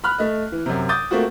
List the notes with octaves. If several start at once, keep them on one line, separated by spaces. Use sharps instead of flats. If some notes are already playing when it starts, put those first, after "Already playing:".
B5 F6 F#6
A3 D#5
E3
F#2 C3
D6 D#6 G6 A6
A3 A#3 C4 F4 F#4